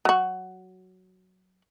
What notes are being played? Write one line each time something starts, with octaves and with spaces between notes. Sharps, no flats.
F#3 F#4